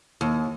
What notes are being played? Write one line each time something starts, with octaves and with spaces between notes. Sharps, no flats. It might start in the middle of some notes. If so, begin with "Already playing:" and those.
D#2